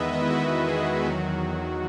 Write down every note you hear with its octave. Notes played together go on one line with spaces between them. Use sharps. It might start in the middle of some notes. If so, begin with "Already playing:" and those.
Already playing: E2 D#3 G#3 B3 B4 D#5 E5
D#5
E4
F#4
G#4
E2 D#3 F#3 F#4